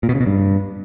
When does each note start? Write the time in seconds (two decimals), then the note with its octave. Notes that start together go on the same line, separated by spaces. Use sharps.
0.03 A#2
0.09 B2
0.15 C#3
0.21 B2
0.26 G2